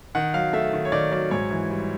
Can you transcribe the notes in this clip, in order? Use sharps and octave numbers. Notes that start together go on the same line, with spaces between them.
D#3 F#5
F#3 F5
A3 E5
D#3
C#5
D#3 D5
F#3 D5
G#2 C#5
E3
G3